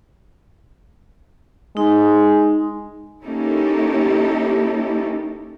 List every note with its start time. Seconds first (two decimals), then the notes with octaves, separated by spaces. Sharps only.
1.77 G#3 D#4
3.24 A#3 C#4 D#4 E4 G4 A4